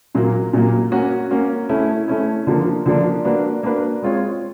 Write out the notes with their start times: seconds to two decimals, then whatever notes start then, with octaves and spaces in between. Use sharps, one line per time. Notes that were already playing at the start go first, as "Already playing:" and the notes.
0.15 A#2 F#3 A#3
0.53 A#2 F#3 A#3
0.91 A#3 C#4 F#4
1.31 A#3 C#4 F#4
1.69 A3 C#4 E4
2.08 A3 C#4 E4
2.47 D3 F3 A#3 D4
2.86 D3 F3 A#3 D4
3.25 A#3 D4 F#4 B4
3.63 A#3 D4 F#4 B4
4.02 G#3 C4 F4 G#4 C#5